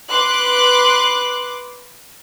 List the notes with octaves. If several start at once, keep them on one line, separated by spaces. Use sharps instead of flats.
B4 C6 D6 F#6